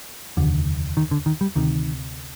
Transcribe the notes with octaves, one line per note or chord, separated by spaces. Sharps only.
F1 D#2 D3
D#3
D3
D#3
G3
D2 C3 D#3